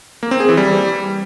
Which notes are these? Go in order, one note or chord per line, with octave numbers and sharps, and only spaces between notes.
A#3
C4
G#4
E3
G3